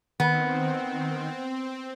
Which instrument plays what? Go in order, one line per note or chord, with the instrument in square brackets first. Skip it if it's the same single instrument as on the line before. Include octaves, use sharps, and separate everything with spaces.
[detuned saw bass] D#3 [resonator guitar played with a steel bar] B3 [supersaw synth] C4